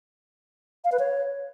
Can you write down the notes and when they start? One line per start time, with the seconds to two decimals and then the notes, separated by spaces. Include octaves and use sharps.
0.85 F5
0.92 B4
0.99 C#5